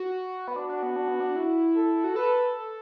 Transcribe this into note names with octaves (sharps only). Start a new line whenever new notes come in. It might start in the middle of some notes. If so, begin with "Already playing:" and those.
Already playing: F#4
B3
D4 F#4
D4
B3
D4
B3
D4
E4
A4
F#4
A4 B4